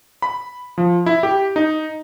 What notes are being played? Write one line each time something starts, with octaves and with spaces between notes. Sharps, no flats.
B5
F3
E4
G4
D#4